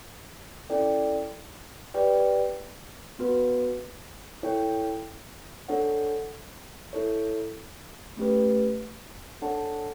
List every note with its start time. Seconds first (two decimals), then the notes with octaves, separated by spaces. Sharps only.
0.70 C#4 E4 A4 D5 G5
1.94 G4 B4 D5 G5
3.19 B3 F#4 B4
4.43 E4 A4 C#5 G5
5.68 D4 A4 C#5 F#5
6.93 E4 A4 C#5
8.17 A3 C#4 G4 B4
9.42 D4 A4 C#5 F#5 A5